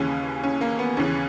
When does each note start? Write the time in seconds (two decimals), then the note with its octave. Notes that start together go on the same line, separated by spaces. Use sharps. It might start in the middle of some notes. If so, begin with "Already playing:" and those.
Already playing: D#2 C#3 E3 C#4
0.43 C#4
0.61 A#3
0.79 B3
0.97 D#2 C#3 E3 C#4